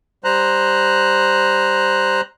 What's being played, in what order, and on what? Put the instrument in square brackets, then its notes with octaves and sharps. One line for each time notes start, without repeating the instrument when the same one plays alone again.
[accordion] G3 C5 A#5 F#6